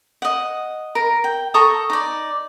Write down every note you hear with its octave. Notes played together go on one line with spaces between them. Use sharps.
D#5 F#5
A#4
G5
A4 A#5 C#6 D#6
D#4 D5